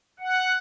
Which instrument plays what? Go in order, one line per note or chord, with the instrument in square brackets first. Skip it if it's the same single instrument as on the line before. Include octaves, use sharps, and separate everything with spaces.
[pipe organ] F#5